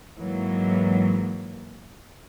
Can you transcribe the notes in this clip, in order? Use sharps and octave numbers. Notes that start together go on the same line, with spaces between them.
G#2 E3 F#3 G#3 A#3